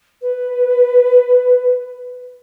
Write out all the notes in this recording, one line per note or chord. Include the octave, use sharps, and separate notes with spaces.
B4